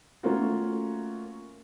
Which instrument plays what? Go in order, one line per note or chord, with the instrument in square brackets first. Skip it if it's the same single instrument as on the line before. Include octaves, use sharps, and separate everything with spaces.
[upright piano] A3 A#3 C#4 F4 F#4